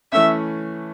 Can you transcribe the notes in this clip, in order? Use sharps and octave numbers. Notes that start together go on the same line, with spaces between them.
E3 A3 C#4 E5